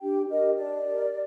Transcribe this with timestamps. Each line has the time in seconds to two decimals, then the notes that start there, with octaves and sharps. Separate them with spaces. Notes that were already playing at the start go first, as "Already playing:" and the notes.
0.01 D4 G4 G5
0.29 G4 A#4 D#5
0.56 D4 D5
0.85 G4 A#4